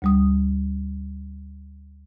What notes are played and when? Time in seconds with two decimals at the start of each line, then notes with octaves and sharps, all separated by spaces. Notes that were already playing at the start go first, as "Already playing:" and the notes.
0.02 D2 G3 D#6